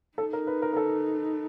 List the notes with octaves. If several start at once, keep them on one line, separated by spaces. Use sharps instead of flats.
D#4 A4
A#4
B4
A#4
A#4
A4